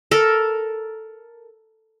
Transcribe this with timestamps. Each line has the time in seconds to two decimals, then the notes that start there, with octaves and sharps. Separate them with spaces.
0.11 A4 A#4